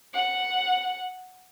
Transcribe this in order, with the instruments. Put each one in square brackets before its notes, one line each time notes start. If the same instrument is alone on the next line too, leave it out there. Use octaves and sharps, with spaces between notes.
[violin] F#5